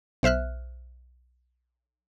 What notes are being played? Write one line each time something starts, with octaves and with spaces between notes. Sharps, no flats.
B1 C5 E5 F6 F#6